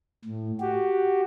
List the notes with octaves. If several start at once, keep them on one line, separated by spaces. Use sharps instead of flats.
A2
F#4 G4